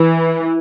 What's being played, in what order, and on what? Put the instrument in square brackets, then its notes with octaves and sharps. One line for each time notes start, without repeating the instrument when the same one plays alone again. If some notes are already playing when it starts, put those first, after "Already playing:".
Already playing: [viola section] E3